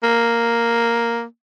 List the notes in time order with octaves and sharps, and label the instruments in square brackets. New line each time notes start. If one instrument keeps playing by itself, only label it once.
[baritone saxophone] A#3